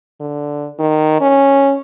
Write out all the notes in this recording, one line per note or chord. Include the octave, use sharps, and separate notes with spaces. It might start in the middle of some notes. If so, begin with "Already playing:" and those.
D3
D#3
C#4